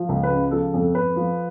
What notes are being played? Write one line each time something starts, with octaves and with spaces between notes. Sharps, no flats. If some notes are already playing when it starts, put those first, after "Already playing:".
Already playing: F3
C#2
B4
C#3
F3 A4
F2
F2 B4
F3